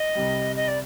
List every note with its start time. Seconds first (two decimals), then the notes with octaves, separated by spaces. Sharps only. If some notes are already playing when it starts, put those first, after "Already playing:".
Already playing: D#5
0.15 C2 C3 G3
0.56 D#5
0.68 D5